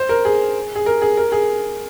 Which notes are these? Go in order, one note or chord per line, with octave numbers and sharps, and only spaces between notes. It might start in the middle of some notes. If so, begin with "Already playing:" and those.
Already playing: C5
A#4
G#4
G#4
A#4
G#4
A#4
G#4